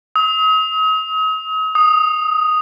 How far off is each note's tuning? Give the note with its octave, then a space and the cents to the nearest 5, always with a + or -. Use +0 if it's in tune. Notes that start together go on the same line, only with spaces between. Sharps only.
D#6 +40
D#6 +0